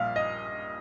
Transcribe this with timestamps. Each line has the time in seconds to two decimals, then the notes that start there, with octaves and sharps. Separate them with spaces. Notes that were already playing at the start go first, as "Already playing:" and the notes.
Already playing: A#1 A#2 G3 F5
0.16 D#5